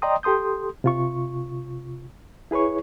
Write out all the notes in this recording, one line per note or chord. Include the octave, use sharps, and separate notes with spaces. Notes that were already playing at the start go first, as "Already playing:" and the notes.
D5 D#5 G5 A#5 C6 D#6
G4 A4 C6 D#6 G6
C3 F4 C#6
E4 G#4 B4 C#5 C#6